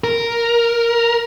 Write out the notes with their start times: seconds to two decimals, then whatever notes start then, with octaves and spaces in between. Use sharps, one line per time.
0.04 A#4